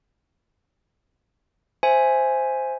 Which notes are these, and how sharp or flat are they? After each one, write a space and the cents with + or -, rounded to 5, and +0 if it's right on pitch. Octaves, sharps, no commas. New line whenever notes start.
C5 +0 E5 +0 G#5 +0